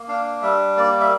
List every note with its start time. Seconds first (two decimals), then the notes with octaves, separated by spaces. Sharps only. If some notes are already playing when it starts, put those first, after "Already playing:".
Already playing: A#3
0.08 D4 F5
0.42 G3 E5
0.77 A#3 D5
1.00 E5